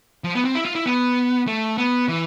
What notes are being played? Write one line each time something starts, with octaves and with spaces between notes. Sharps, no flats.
F3
B3
C4
E4
F4
E4
B3
A3
B3
E3